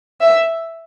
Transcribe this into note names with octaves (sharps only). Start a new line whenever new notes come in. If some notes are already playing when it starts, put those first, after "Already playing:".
E5